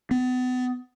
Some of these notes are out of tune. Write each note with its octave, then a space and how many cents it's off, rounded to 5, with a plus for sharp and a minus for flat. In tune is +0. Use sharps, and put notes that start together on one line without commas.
B3 +35